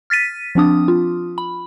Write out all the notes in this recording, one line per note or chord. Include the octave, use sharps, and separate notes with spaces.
F6 A6 B6 D#7
F3 C4 D4 D#6
F4
B5